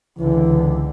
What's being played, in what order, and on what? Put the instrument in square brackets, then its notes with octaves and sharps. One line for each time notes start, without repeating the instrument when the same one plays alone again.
[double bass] C#2 D3 [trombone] E3